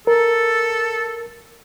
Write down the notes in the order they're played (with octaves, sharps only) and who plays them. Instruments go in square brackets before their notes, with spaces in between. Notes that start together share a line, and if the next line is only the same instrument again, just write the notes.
[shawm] A4 [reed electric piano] A#4